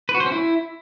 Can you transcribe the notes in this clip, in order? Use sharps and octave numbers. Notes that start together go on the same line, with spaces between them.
B4
F#4
C5
C#4
E4